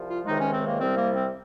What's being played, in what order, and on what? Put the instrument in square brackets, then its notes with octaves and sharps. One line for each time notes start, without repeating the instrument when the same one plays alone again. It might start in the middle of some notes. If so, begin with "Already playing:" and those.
Already playing: [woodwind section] C2 F3
F4
C#2 C3 D#3 G#3 D#4
C#4
C4
A#3
C2 C3 G3 C4
A#3
C4